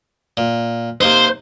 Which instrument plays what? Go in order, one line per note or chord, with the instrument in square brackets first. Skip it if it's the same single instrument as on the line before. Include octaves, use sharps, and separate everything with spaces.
[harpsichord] A#2
[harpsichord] C3 A#3 D#4 [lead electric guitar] C5